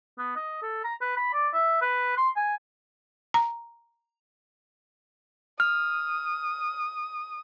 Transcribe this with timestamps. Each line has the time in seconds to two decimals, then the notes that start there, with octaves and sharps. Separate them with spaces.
0.18 B3
0.36 D#5
0.62 A4
0.84 A#5
1.01 B4
1.17 B5
1.33 D5
1.54 E5
1.82 B4
2.17 C6
2.36 G#5
3.34 A#5
5.60 D#6 F6